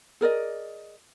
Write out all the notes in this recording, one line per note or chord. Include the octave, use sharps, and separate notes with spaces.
G#4 A#4 D5 D#5